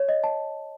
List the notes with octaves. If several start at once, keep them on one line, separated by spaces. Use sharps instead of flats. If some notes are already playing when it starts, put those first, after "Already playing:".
Already playing: C#5
D#5
A5